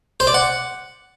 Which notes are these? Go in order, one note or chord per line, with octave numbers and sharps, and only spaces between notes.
C5
D5
F#5